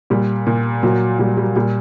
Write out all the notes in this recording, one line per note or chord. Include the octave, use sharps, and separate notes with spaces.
A#2 G3
A#2
A#2 F#3
A#2 G3
G3
A#2 G3